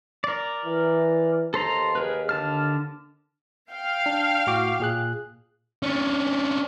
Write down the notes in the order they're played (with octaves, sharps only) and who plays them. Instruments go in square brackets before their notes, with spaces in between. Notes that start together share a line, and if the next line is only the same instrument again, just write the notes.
[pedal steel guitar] A#4 D5
[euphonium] E3
[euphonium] D#2 [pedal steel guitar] A4 C5 A#5
[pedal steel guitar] G#4 A#4 B4
D3 A5 F6
[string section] F5 G5
[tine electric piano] D4
A2 F#4 D6
A#2 G#4 F#6
[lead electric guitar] C#4 D4